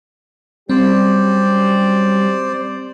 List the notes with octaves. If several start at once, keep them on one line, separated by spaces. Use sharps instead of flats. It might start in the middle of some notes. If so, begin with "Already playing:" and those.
F#3 G3 C4 C#4 G4 C5 D5